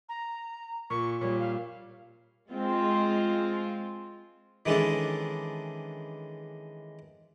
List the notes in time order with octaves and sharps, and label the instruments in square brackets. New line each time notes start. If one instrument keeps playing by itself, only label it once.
[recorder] A#5
[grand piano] A#2 [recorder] C#6
[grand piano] A#2 G3 [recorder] C#5
[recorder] F5
[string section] G#3 C4 F4
[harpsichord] D#3 E3 G#3 C#4 D4 A4